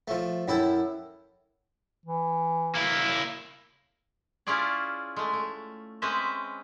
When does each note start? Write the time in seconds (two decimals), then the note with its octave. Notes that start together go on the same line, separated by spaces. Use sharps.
0.08 F3 A3
0.48 F#2 E4 A4 G5
2.06 E3
2.75 A#3 E4
4.47 C#4 E4 F4 G#4 D5
5.16 G#3 A3
5.33 A3
6.02 G#3 C4 C#4 B4 D#5 E5